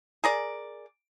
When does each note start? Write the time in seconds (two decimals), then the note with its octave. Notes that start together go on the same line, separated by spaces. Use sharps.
0.24 G#4 A#4 D5